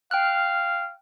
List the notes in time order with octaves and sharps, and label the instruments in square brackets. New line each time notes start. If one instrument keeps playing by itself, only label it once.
[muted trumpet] F5 [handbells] G5 F6 F#6